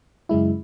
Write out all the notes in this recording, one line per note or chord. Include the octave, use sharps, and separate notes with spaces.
F#2 C#3 G#3 E4